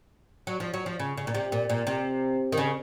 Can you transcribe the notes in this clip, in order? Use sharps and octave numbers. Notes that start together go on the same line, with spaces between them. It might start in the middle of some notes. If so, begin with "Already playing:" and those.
F#3
F3
F#3
F3
C#3
C#3
A#2
C3
A#2
A#2
C3
D#3
C#3